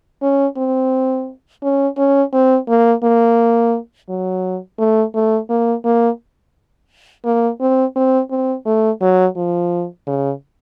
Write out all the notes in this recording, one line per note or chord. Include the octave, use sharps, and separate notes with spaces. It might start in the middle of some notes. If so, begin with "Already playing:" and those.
C#4
C4
C#4
C#4
C4
A#3
A#3
F#3
A3
A3
A#3
A#3
A#3
C4
C4
C4
A3
F#3
F3
C#3